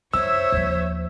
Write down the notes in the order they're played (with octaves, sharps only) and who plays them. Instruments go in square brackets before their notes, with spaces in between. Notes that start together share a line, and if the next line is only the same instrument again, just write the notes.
[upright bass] F#2 E4 [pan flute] C5 [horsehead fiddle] C#5 E5 [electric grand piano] E6
[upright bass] D#2 F3